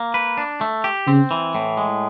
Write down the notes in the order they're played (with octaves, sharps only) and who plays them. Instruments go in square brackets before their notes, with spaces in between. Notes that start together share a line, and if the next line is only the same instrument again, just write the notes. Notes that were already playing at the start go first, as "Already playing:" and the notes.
Already playing: [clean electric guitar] A#3
B4
D4
A3
G4
[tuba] C#3 [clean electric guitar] C4
[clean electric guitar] E3
A2
G#3